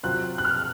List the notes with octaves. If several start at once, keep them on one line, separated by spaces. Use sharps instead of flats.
C3 F#3 C4 F4 C5 F#6
F#6
F6